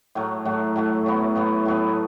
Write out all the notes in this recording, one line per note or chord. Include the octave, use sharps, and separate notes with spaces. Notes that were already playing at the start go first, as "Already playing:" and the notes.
A2 F#3 A3
A2 F#3 A3
A2 F#3 A3
A2 F#3 B3
A2 F#3 B3
A2 F#3 B3